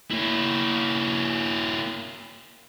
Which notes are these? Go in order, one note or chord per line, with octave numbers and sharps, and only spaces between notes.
A#3 E4